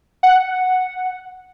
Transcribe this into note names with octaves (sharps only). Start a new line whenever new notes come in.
F#5